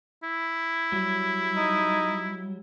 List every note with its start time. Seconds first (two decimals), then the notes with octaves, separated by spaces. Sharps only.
0.23 E4
0.92 F#3 G3
1.56 D#4